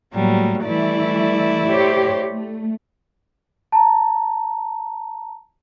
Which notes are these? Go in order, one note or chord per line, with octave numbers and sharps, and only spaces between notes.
A2 F#3 G3 A#3
E3 G3 A3 E4 D5
G4 C5 C#5
A3
A5 A#5